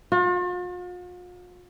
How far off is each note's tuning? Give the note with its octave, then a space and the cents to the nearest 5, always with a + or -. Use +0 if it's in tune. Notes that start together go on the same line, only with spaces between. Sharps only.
F4 +45